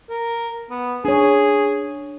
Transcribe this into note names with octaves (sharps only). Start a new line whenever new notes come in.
A#4
B3
D4 G#4 C#5